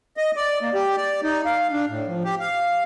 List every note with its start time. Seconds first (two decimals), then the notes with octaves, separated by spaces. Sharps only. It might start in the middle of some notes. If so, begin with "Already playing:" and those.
0.17 D#5
0.36 D5
0.61 A#3
0.74 G4
0.96 D5
1.23 D#4
1.45 F5
1.71 D4
1.88 A2
2.07 F3
2.24 G4
2.40 F5